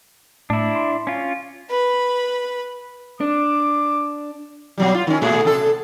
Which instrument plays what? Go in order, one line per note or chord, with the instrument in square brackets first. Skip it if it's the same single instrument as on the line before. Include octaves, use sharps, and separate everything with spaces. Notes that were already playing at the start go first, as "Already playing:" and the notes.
[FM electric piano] A2 [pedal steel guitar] D4 E4
[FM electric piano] C6
[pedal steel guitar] C#4 F4
[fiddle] B4 B5
[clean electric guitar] D4 [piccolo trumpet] D6
[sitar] B2 F#3 G3
F4
D#3 C#4
A#2 A3 G#4
C3 A4